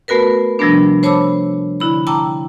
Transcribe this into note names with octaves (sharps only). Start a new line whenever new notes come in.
A3 B3 F#4 A#4 B4
C3 F3 G3 A3 B3 D4
C5 C#5 A5 B5 D6 E6
D3 E4 B5
G5 A5 A#5 D6 E6